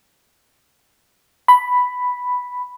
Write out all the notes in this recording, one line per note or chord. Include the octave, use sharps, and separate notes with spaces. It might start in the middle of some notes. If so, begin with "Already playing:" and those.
B5